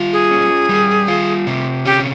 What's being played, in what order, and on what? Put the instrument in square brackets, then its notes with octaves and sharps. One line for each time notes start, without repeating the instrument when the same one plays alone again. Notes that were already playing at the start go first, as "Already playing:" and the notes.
Already playing: [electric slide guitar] G3 F4
[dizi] G#4
[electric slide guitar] C#4
G3
F4
C3
[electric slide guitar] C#4 [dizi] G4